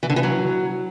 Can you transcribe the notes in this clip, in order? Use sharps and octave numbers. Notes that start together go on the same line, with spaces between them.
E3
D3
E3
F#3